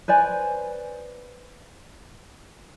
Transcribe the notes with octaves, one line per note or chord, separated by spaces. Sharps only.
B4 C5 D5 G#5